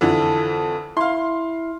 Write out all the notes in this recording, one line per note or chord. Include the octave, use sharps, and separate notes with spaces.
F2 D3 E3 A4
E4 F5 C6